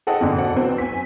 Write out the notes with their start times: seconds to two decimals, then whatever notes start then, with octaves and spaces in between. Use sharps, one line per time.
0.07 G#4 A4 D#5 F#5 G5
0.21 F2 B2 D3
0.37 F#4 D5 F#5
0.53 F#3 B3 C4
0.78 G#5 B6